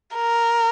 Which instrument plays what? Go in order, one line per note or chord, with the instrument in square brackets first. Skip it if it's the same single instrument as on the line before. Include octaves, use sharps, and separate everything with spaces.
[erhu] A#4